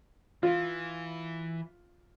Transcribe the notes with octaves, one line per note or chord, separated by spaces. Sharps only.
E3 F4